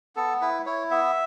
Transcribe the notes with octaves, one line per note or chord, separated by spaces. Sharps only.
B3 A4
E4 B4
E4 C#5
B3 E5